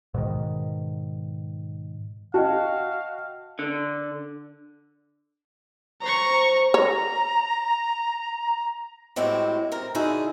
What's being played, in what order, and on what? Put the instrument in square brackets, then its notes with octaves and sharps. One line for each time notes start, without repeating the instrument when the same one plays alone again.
[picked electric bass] G#2 B2 D#3
[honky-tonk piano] F#4 [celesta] D#5 G5 A5 [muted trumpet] F5
[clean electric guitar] D3
[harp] C5 C#5 [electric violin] A#5 C#6
[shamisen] C#5 [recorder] A#5
[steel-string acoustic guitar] A2 G#3 C4 E4 F#4 G4
C4 A#4
D3 D#4 E4 F#4 G#4